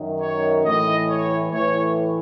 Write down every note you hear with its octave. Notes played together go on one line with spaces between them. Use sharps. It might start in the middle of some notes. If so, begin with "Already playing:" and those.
Already playing: F#2 D#3
C#5
A2 E3 D#5
C#5
A2 E3 C#5